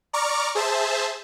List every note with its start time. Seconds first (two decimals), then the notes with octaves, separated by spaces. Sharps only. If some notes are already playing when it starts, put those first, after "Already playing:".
0.13 D5 A#5 C#6 D6 F6
0.55 G#4 C5 E5 A5